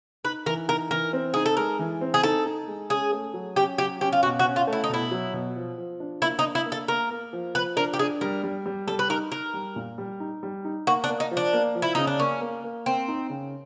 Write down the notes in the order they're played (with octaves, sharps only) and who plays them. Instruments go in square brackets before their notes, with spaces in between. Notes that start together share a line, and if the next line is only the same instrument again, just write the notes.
[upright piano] D#4 [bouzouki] B4
[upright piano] E3 [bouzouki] A#4
[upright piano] D#4 [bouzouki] A#4
[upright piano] E3 [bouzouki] A#4
[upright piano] C4
[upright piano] D#4 [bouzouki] G#4
[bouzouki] A4
[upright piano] G#3 [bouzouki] A#4
[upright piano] E3
C4
[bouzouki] G#4
[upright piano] D#4 [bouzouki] A4
[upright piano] D#4
G#3
[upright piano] C#4 [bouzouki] G#4
[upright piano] A3
F#3
[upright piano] C#4 [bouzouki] G4
[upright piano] F#3 [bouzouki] G4
[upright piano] C#4 [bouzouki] G4
[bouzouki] F4
[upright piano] B2 [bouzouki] F#4
[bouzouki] F#4
[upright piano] C#4
[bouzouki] F4
[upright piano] A3
[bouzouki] E4
D#4
[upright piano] B2 [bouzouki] E4
[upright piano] F#3
B2
F3
F3
D4
[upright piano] A#3 [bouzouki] E4
[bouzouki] D#4
[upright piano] D4
[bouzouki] E4
[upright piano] A#3
[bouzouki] A4
[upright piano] A#3 [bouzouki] A#4
[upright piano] A#3
F3
[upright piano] F3 [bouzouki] B4
[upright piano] D4 [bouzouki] A#4
[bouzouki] G4
[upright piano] D4 [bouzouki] G#4
[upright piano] G3 [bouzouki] A#4
[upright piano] G3
G3
[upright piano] G3 [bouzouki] A4
[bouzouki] B4
[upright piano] D#4 [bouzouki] A#4
[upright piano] D#4 [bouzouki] A#4
[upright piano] G3
A#2
G3
D#4
G3
D#4
[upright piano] A#3 [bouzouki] F#4
[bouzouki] D4
[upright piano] A#3
[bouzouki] D#4
[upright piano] F3
[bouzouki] D4
[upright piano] A#3
F3
[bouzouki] E4
[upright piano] C#3 [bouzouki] D#4
[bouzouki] D4
[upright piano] A#3 [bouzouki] C#4
[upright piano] A#3
A#3
[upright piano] A#3 [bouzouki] C4
[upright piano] D#4
C#3